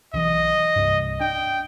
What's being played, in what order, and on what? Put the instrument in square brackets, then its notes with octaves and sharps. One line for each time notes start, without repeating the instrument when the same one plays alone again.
[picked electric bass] B1 E3 [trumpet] D#5
[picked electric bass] C2 G2
[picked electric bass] D4 [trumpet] G5